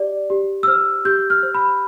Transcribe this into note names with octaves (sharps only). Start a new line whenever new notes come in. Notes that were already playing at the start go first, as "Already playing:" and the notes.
Already playing: G4 D5
G4
E6
C5 F6
G4 G6
F6
C5
B5